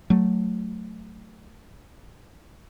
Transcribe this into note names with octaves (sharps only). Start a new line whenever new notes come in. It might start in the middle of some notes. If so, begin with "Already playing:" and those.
F#3 A3